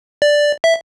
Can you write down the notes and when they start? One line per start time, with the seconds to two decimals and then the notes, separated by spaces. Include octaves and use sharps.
0.22 D5
0.64 E5